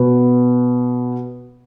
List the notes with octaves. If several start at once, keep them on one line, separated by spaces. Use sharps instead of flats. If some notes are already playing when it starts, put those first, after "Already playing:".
Already playing: B2 B3